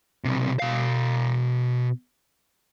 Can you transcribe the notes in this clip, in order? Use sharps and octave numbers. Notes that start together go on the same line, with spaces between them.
B1 C3
B2 F5